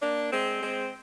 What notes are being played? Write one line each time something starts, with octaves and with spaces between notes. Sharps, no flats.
A#3 D4
G#3 C4
G#3 C4